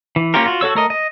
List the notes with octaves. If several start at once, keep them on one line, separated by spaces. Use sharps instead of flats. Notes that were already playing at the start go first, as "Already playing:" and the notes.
E3
A#3 C#4 F4 G4 A#4
F4 F#4
F#4 A4 C#5 E6
A3 A#4 D#5
D#5